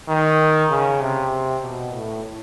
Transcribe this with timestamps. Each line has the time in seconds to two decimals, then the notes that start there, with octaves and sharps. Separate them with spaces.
0.08 D#3
0.71 C#3
1.01 C3
1.62 B2
1.93 A2